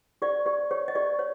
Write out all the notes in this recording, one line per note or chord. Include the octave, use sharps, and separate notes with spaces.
G4 D5
G4 D5
G4 C#5
D#5
G4 D5
C#5